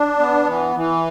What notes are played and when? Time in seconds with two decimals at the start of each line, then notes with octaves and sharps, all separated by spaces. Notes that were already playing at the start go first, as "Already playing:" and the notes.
Already playing: D4
0.19 B3
0.47 E3
0.75 E3